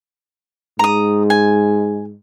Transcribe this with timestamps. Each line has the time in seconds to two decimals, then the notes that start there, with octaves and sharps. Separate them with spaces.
0.79 G#2 A#5 D#6
1.30 G#5